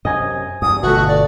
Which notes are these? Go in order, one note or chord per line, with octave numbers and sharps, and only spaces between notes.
F#2 C3 D#5 G#5
E2 G2 D#6
G1 B2 A3 F#4
D5